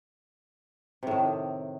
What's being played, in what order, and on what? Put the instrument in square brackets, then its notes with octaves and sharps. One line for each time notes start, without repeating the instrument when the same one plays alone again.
[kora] C3
A2
D#3